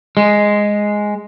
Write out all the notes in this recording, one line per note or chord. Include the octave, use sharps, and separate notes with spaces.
G#3